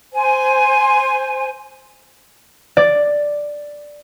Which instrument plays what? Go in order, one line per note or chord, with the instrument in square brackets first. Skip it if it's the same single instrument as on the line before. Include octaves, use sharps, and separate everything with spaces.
[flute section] C5 G#5
[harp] D5